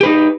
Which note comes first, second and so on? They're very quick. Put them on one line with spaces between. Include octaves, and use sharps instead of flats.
G4 B4 D#4